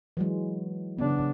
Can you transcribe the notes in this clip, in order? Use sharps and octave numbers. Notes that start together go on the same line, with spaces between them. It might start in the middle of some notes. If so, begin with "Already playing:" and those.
E3 F#3 G#3
C#3 B3 D4